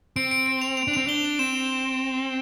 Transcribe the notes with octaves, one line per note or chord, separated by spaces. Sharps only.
C4 D7
D7
D7
F7
F7
D4
C4 F7
D4 G7
F7
C4 E7